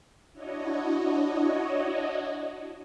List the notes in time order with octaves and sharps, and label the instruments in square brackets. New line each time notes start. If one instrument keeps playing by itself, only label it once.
[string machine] D4 E4 F#4 C#5 D#5